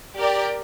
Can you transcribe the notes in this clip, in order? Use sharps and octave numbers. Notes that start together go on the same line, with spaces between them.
G4 A#4 D5 G5